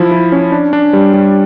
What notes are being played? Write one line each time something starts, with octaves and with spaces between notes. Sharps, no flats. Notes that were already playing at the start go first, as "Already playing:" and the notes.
Already playing: F3 E4
E4
C#4
D4
D4
G3
G3